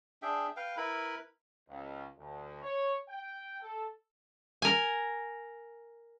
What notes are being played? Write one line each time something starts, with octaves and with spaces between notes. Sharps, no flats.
D4 G#4 E5 G5
B4 F5 G5
E4 A#4 B4 B5
C#2
D2
C#5
G5
A4
A#4 G#5